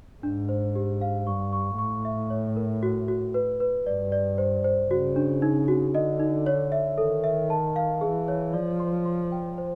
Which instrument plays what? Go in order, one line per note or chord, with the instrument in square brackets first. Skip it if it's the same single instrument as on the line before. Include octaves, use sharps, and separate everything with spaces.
[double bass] G#2 [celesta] D4
[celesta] C5
G4
F5
[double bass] G2 [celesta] C#6
[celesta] C#6
[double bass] A2 [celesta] C#6
[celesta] E5
C#5
A#4
F#4
F#4
B4
B4
[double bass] G2 [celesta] D5
[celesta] D5
C5
C5
[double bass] C#3 [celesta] F#4
[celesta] D4
D#4
F#4
[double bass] D3 [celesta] D#5
[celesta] D#4
C#5
E5
[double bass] D#3 [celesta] A4
[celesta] E5
A5
F5
[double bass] E3 [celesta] G#4
[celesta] C#5
[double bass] F3 [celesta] D5
[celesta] C6
C6
G5
C5